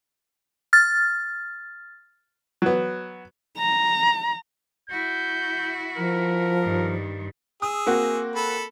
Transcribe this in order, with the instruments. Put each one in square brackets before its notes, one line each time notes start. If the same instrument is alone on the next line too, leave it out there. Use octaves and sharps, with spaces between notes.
[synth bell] F6 A6
[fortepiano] F#3 B3
[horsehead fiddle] A#5
[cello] E4 F#4 [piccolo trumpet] G6
[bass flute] F3 [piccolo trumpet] A#4
[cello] G2 D#3
[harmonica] G#4 E6 [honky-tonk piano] D#6
[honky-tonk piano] A#3 C4 F#4
[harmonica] A4 B5